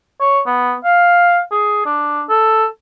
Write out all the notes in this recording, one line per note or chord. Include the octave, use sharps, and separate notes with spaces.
C#5
B3
F5
G#4
D4
A4